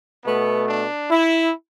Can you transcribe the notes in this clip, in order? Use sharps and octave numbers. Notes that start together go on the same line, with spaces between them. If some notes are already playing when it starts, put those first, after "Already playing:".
B2 A3 B3
D4
E4